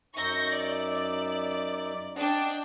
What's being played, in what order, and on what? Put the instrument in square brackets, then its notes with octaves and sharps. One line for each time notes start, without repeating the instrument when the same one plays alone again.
[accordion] F#2 D#4 E5 [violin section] C#6 G6 A#6
[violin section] D5
D5
[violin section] D4 G5 [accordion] D5 D#5 F#5